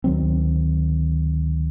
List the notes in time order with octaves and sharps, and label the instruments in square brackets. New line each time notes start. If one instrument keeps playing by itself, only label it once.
[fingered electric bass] D2 D#3 F#3 C4